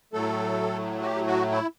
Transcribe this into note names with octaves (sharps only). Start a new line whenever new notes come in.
A2 F#3 A3 A4
F#4
G4
F#4
E4